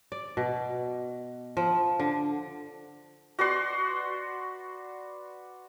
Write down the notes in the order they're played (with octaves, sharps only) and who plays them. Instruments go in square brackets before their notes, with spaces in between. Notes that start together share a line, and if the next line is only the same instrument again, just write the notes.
[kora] D5
B2
F3
D3
[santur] F#4 B4 D5 C6